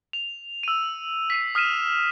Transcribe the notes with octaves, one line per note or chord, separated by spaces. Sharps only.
F7
E6 D#7
B6 C7 D#7
D#6 F6 B6 D#7 E7